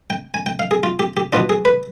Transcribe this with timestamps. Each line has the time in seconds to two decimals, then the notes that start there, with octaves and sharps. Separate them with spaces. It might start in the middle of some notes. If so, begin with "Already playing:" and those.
0.10 G5
0.34 G#5
0.46 G5
0.59 F5
0.71 G#4
0.83 F4
0.99 G4
1.17 G4
1.33 B2 B3 D4 F4
1.50 G#4
1.65 B4